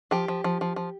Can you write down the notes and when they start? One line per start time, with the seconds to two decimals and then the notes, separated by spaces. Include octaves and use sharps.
0.11 F3 G4
0.28 F3
0.44 F3
0.61 F3
0.76 F3